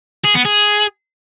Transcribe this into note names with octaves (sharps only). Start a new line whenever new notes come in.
G#4
B3
G#4